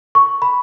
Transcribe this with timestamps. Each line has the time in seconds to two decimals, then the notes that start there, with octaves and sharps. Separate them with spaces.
0.15 C#6
0.42 B5